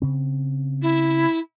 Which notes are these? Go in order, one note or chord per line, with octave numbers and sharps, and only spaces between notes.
C#3 C4
E4